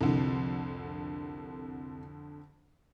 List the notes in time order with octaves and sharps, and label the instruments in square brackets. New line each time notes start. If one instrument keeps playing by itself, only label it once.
[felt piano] C2 [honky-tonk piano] F2 D3